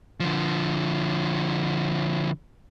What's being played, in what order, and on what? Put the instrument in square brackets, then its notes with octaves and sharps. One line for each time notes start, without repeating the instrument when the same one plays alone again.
[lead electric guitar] D3 F3